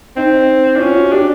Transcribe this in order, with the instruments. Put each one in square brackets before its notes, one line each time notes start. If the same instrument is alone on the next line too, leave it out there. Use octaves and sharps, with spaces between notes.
[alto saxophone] C4 [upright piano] D#4
[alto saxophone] D4 [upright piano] E4
[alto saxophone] C#4 [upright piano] F4
[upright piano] F#4
[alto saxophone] D4 [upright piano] G4